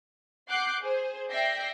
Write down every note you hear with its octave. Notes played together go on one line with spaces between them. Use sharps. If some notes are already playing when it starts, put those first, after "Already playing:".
F#5 D6 F#6 G6 C7
G#4 C5
D5 E5 G5 G6 A#6 C7